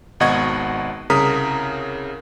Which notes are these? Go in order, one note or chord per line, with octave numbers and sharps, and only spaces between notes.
G#1 B2 D#5 F#5 C#6 G#6
C2 C#3 A#4 A#5 D#6 B6